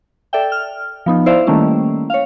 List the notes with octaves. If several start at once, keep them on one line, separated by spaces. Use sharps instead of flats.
A4 D5 E5 G5
F6
F3 B3 D#4
E4 C5 D5 E5 F5
D#3 G3 A3 A#3 C#4 E4
C#5 F5